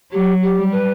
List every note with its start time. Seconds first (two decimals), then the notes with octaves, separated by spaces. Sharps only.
0.12 F#3 G4
0.42 G4
0.57 G3
0.71 B4